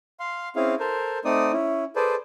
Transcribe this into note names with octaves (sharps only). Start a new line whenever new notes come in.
F5 C6
C4 C#4 E4 G#4 F5
A4 A#4 C5
A3 C4 D#4 D5 D#6
C#4 E4
G#4 A4 B4 C5 D5